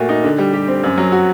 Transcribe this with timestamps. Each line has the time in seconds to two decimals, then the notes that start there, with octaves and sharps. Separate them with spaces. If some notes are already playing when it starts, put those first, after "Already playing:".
Already playing: A#2 A3 F#4
0.09 D#4
0.24 D3
0.38 G3
0.53 G4
0.68 C4
0.84 F#2
0.97 F#3
1.12 F#4